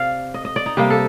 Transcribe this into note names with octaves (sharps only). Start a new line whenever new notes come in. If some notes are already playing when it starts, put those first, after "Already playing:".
Already playing: C3 D5 F5
D#5
D#5
D5
D#4
C3 G3 A#3 G4
A4